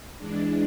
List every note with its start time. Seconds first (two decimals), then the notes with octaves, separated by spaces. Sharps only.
0.18 E3 G#3 D4